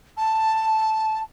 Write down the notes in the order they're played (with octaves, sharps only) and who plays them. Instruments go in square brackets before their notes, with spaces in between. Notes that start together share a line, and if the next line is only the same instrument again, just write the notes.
[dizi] A5